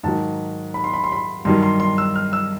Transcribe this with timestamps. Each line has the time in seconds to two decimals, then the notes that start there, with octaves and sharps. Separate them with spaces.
0.03 G#2 D#3 F#3 A5
0.74 B5
0.84 C6
0.93 B5
1.04 C6
1.12 B5
1.45 G2 D#3 F#3 C6
1.63 C6
1.80 C6
1.98 E6
2.16 F6
2.33 E6